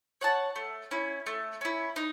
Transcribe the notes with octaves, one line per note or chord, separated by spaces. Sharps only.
C#5 F#5 A5
A3
C#4 E4
A3
C#4 E4
D#4